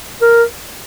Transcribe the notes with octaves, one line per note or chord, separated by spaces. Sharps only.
A#4